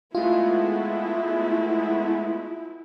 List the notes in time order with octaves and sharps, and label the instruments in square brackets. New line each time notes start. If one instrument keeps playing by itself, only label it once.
[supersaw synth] G#3 A3 B3 [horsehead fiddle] E4 [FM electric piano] F4